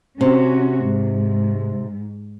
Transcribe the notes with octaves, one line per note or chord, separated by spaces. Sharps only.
C3 C#4 F#4
G#2